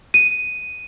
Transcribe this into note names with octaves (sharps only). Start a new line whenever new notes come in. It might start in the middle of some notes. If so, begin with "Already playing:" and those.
D#7